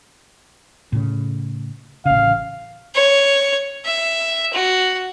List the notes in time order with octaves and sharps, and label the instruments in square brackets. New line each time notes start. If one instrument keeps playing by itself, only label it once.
[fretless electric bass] A2 C#3
[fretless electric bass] A1 C#3 [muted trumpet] F5
[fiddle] C#5
E5
F#4